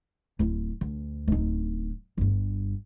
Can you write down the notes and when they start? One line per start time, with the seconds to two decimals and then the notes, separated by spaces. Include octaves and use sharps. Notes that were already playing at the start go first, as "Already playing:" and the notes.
0.39 D1 E4
0.81 D2
1.28 D1 D#4
2.18 G1 G2